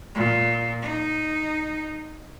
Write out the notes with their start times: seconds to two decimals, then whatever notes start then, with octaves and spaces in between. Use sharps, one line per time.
0.15 A#2
0.82 D#4